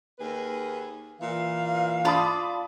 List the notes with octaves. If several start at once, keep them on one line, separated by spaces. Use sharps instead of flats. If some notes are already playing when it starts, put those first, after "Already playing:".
D#2 G#4 B4
A#2 E3 F5
F4 D5 A5 B5 D#6